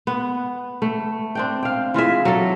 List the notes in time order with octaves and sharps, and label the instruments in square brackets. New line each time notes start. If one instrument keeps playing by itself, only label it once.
[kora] B3
A3
C4 D4 G5
F5 G5
E3 F4 G#4 E5
F#3 A4